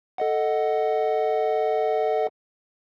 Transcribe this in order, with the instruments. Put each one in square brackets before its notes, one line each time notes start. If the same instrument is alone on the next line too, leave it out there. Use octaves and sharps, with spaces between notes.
[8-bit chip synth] A4 D#5 F#5